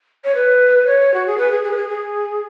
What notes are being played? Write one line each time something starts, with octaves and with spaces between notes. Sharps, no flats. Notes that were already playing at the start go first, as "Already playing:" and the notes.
C#5
B4
C#5
F#4
G#4
B4
G#4
G#4
B4
G#4
G#4